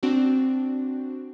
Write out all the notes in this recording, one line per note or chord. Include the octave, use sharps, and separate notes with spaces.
C4 D4 F#4